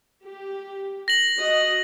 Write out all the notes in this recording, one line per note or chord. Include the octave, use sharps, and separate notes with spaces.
G4
A#6 F#7
F#4 D#5